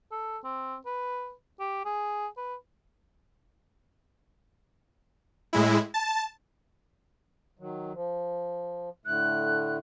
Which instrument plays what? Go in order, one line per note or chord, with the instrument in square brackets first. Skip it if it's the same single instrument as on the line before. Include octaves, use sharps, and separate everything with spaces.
[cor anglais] A4
C4
B4
G4
G#4
B4
[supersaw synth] A2 G#3 E4
A5
[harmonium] D#3 F#3
F3
[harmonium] A2 D3 A3 [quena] F#6